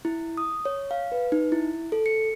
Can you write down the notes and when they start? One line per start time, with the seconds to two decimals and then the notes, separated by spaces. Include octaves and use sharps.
0.05 E4
0.37 D#6
0.65 C#5
0.91 F5
1.12 B4
1.32 D#4
1.52 E4
1.92 A4
2.06 C#7